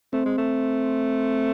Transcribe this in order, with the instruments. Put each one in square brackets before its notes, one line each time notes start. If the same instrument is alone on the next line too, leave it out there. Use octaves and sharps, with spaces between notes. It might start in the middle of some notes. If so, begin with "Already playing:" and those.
[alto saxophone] A3 [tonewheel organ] C4
[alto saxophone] G#3
A3